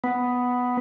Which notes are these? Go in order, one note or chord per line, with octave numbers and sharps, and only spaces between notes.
B3